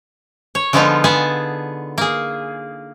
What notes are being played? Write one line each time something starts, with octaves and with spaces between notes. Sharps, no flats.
C#5
D3 F3 G#3 B3 D#4 F4
B3 G#4 G#5 A5
A#3 G#4